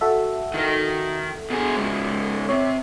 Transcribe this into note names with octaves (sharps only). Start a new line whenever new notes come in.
F#4 A4 E5
D#3 A#4
B2 G#4
G#2 C#3
C3 C#5